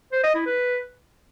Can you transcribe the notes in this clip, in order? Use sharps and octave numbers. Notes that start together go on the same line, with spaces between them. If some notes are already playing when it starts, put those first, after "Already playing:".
C5
D#5
E4
B4